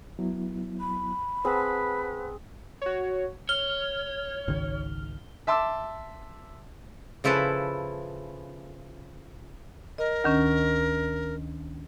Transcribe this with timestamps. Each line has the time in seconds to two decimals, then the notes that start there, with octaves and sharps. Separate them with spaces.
0.19 F#3 B3 E4
0.80 B5
1.45 C4 G#4 B4 C5 F#5 A5
2.82 F#4 C#5
3.49 C#5 F6 G7
4.48 G#1 C#2 D#3
5.47 E5 A5 C6 D6 E6
7.24 C#3 F3 E4 A4 B4
9.98 A#4 D#5
10.24 D2 D#3 C#4